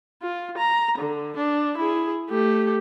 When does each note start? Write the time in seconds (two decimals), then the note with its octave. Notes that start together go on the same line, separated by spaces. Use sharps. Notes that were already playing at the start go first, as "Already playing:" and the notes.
0.22 F4
0.58 A#5
0.98 D3
1.37 D4
1.77 E4 G#4
2.30 A3 G4